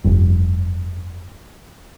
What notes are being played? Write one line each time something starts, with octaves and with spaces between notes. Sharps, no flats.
F1 G2